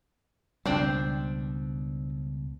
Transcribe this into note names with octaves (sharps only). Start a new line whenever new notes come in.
C#2 B2 G3 C4 D4 C5